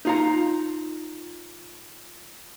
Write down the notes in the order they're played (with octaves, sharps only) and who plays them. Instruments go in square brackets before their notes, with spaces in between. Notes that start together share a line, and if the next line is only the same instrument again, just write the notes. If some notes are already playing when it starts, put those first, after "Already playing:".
[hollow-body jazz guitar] D#4 F4 A#5